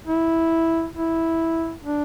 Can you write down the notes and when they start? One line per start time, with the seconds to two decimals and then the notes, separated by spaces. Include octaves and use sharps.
0.07 E4
0.95 E4
1.83 D4